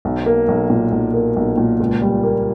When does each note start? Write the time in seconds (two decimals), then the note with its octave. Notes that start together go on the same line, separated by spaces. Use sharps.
0.05 B1
0.26 A#3
0.48 B1
0.70 A#2
0.92 B1
1.14 A#3
1.36 B1
1.58 A#2
1.80 C#2
2.02 G3
2.23 A#3